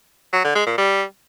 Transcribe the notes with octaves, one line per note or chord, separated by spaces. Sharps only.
F#3
D3
G#3
A#2
G3